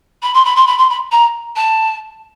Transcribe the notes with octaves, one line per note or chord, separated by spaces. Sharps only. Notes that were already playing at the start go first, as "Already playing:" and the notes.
B5
C6
B5
C6
B5
C6
B5
A#5
A5